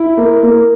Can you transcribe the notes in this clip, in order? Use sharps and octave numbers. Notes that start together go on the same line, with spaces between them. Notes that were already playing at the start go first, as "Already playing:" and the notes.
Already playing: E4
A#3
A#3